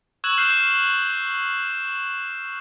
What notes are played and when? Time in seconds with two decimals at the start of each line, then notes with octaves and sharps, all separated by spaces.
0.24 C#6 E6 F#6 G#6 E7 F#7
0.38 F6 G6 C7 E7